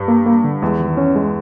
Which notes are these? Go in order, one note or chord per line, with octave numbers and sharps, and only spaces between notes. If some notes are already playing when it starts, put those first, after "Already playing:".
Already playing: G2
A#3
A#3
D3
E2 G#3
D#3
C#4
G#3